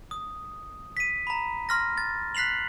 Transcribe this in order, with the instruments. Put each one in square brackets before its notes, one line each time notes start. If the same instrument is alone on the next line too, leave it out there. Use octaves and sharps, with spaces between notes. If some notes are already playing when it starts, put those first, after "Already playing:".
[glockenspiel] D#6
B6 D#7
A#5 B5
C6 F6 A#6
A6
F#6 B6 C7 F7 F#7